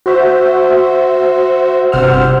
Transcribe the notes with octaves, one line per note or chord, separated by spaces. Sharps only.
F#4 C5 E5
G1 C3 C5 F#5 E6 F6